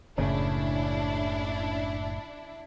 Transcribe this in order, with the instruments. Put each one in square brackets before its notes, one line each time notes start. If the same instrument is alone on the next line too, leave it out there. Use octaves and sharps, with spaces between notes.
[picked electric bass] F#1 A2 [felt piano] C#3 [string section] D4 E4